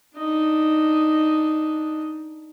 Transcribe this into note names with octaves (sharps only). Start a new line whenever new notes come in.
D4 D#4